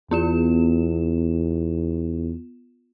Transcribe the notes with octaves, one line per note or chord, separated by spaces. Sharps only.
E2 B3 F4 E7